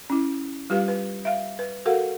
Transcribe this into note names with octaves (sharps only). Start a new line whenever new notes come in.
C#4 E4
G3 F4 G4 B4 F5
B4
E5 F5
B4
F#4 A4 A#4 F5 F#5